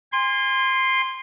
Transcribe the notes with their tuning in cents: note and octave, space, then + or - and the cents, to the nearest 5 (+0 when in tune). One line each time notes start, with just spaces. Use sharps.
G#5 -40 C6 +0